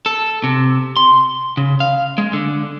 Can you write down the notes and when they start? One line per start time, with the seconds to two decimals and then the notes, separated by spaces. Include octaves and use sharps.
0.06 A4
0.43 C3
0.97 C6
1.57 C#3
1.80 F5
2.18 G#3
2.33 D3